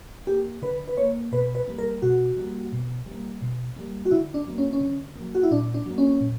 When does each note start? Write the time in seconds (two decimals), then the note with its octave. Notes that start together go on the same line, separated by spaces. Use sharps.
0.27 A#3 G4
0.62 D3 B4
0.87 B4
0.97 A#3 C#5
1.32 B2 B4
1.55 B4
1.68 G3 A#3
1.78 A#4
2.02 B2 F#4
2.37 G3 A#3
2.72 B2
3.06 G3
3.11 A#3
3.42 B2
3.76 G3 A#3
4.05 F#4
4.11 D3 E4
4.34 D4
4.47 F#3 A#3
4.58 C#4
4.73 C#4
4.81 D3
5.16 A#3
5.21 F#3
5.35 F#4
5.43 E4
5.51 A#2 D4
5.74 D4
5.86 F#3 A#3
5.98 C#4
6.21 A#2